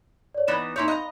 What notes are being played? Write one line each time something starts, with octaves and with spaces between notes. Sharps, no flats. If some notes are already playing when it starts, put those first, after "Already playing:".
C#5 D5
E3 B3 D#4 B5 A6 E7
A#3 D#4 E4 C#5 C6 G6
D#5 F5 A#5 B5 F#6